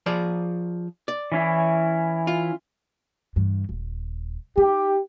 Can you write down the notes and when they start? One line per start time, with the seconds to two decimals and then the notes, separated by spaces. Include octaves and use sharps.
0.06 F3 G#4 D5
1.08 D5
1.32 E3 C#4 E4
2.27 F4
3.36 G2 E3
3.69 D#1
4.58 D#4 G4